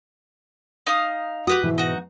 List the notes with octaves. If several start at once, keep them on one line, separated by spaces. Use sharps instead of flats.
D#4 F5 D#6
F#4 G4 B4 D#6
G#2 B2 E3
D#4 F#4